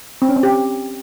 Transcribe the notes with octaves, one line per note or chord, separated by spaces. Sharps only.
C4
C#4
C4
G4